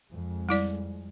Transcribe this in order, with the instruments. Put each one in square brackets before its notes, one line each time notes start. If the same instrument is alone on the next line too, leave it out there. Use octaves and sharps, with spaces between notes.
[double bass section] F2 G#3
[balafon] G3 E4 D5